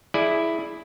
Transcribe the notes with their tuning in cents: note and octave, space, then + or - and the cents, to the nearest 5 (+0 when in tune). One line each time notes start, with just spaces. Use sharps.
E4 +0 G#4 +20 D5 +10